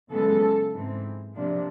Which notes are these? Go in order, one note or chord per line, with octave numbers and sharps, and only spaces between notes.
F#2 C#3 E3 G#3 B3 A4
G#2 E3 G#3 C4
C3 F3 A#3 D4